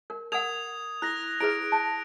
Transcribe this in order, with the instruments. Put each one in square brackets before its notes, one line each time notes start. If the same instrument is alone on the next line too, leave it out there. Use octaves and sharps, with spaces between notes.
[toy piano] A#4
[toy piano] A#4 F#5 [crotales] D#6 G#6 F7
[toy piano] E4 [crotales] F#6 A#6
[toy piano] E4 G#4 B4 [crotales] D7
[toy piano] A5